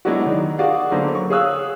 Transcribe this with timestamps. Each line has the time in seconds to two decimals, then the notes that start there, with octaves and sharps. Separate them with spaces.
0.05 F#3 G#3 B3 D4 E4 F#4
0.26 D#3
0.58 F#4 G#4 D5 F5 F#5
0.91 D3 F#3 A#3 B3 C5
1.15 C#6
1.30 G#4 C#5 F5 D#6 E6 F#6